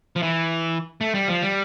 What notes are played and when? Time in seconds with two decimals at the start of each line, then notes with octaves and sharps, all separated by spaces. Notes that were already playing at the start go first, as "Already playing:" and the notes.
0.16 F3
0.23 E3
1.01 A3
1.15 G3
1.28 F3
1.42 G3